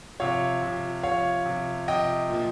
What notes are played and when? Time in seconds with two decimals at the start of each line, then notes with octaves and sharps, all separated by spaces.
0.20 C3 F3 C#5 F5
0.62 C3 F3
1.03 C3 F3 C#5 F5
1.46 C3 F3
1.88 C3 F3 D#5 G5
2.30 A#2 F3